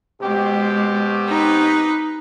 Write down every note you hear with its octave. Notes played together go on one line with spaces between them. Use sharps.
B2 G#3 C4 G4
D#4 B4